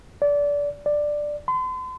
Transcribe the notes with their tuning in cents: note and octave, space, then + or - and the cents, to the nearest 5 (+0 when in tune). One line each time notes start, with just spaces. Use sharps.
D5 -20
D5 +10
C6 -45